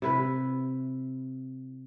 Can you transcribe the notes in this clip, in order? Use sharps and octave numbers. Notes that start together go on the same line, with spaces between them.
C3 E4 B4